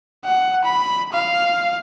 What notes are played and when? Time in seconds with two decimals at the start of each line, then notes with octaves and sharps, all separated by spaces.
0.25 F#5
0.65 B5
1.12 F5